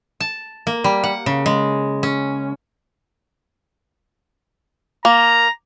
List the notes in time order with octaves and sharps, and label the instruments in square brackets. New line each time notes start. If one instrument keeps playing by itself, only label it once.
[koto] A5
A#3
G3
F#5
C#3
G#3
C#4
[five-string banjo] A#3 [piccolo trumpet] A#5